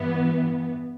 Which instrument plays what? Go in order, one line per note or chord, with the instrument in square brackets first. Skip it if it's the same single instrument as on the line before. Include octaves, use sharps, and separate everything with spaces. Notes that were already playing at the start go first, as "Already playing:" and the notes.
Already playing: [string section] G2 E3 B3